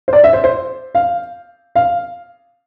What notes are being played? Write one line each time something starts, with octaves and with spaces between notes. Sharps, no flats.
C5
D5
E5
C5
C5
F5
F5